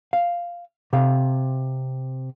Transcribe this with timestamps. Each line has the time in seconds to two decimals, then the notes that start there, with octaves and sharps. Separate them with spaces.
0.13 F5
0.93 C3 F5